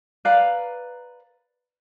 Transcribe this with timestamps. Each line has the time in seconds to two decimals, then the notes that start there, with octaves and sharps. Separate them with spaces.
0.25 B4 D5 F5 A#5